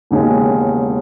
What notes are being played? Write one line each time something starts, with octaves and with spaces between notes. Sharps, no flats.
E1 D#2 C#3 G#3 C#4